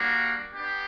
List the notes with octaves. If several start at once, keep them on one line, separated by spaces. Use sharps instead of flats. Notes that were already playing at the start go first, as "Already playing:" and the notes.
Already playing: G3 A#3 D4 F#4
B3 D4 G4